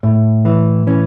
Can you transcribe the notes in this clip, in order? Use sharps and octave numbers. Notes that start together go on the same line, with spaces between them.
A2
E3
E3 C#4